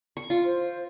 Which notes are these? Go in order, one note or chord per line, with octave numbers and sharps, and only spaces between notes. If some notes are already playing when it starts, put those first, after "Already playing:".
C#6
F4
C5